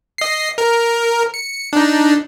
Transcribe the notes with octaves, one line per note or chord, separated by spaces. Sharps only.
D#5 C7
A#4
C#7
D4 D#4